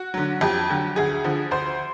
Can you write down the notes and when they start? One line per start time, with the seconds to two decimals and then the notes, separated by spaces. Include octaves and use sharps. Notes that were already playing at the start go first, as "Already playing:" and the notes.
Already playing: F#4
0.14 D3 F#3
0.41 F2 G4
0.70 D3 F#3
0.96 D2 G#4
1.24 D3 F3
1.51 D2 C5